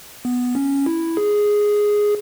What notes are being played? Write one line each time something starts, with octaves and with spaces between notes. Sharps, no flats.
B3
C#4
E4
G#4